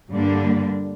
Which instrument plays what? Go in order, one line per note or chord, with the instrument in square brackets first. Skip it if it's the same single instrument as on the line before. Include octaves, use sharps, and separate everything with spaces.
[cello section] G2 D3 G3 A#3 D4